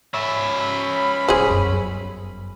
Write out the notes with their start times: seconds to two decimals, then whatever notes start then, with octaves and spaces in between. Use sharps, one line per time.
0.14 C#4 E5 B5
1.28 D#1 F#3 G#4 C5
1.50 G1 F#2